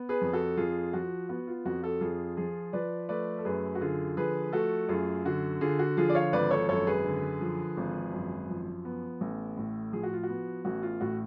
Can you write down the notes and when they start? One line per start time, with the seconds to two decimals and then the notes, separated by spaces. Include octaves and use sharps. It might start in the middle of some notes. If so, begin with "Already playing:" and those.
Already playing: B3
0.09 G#4 B4
0.21 F2
0.33 F#4 A4
0.57 F2 F4 G#4
0.93 F3 F#4
1.29 B3 F#4
1.47 F4
1.65 F2 F#4
1.83 F#4 A4
2.01 F2 F4 G#4
2.37 F3 F4 G#4
2.73 F3 B4 D5
3.09 A3 B4 D5
3.39 A4
3.45 F#2 G#4 B4
3.75 F#4
3.81 D3 F4 G#4
4.17 F3 G#4 B4
4.53 A3 F#4 A4
4.89 F#2 F4 G#4
5.25 D3 F#4
5.61 D3 F4 G#4
5.79 F#4
5.97 F3 F4 G#4
6.09 D5
6.15 C#5 F5
6.33 G#1 B4 D5
6.51 A4 C#5
6.68 F#2 A4 C#5
6.87 G#4 B4
7.05 D3
7.41 F3
7.77 G#1
8.13 F#2
8.49 F3
8.85 B3
9.21 A1
9.57 A2
9.92 F3 G#4
10.03 F#4
10.13 F4
10.23 F#4
10.29 B3
10.65 A1 F#4
10.83 F4
11.01 A2 F#4